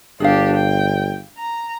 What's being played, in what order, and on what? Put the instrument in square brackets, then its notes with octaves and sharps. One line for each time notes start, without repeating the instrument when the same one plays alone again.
[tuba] G1 [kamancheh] D4 G4 [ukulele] G#4 F5
[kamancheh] G5
A#5